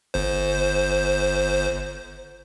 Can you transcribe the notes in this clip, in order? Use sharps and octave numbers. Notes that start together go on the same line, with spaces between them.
G1 C5